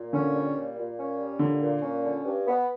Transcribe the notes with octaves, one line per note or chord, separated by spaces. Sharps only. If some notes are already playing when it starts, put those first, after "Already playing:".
Already playing: A#2
D3 C#4
G3
A#2
A#2
C#4
G3
A#2 D3
A#2
C#4
D3
G2
B3